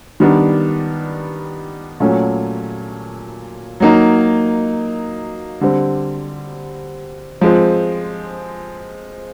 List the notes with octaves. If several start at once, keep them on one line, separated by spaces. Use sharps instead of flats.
D#3 G3 B3 D4
A#2 F#3 A3 C#4
F#3 A#3 D#4
D3 G3 C4
F3 G#3 C4